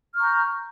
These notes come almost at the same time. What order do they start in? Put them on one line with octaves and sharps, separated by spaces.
F6 C#6 A#5 G6